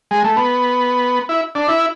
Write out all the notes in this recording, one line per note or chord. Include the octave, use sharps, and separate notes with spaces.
G#3
A3
B3
E4
D4
E4